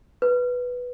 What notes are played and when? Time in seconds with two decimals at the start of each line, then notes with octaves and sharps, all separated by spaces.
0.22 B4